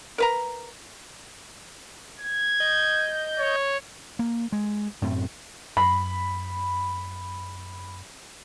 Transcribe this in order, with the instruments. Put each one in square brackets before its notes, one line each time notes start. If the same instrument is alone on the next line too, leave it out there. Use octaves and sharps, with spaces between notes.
[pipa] A#4 B4 A#5
[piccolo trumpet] G#6
[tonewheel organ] D#5 G6
[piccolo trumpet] C#5
[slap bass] A#3
G#3
F#2 A2 A3 C4
[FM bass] F#2 [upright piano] B5